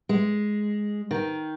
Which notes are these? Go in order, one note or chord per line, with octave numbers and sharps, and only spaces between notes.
G#3
D#3